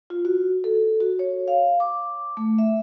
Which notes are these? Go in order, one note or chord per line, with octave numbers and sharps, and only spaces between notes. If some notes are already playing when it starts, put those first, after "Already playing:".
F4
F#4
A4
F#4
C#5
F5
D6
A3
E5